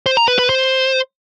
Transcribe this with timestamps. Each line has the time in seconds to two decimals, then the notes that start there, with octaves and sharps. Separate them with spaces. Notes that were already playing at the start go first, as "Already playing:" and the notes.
0.06 C5
0.17 A#5
0.28 B4
0.39 B4
0.50 C5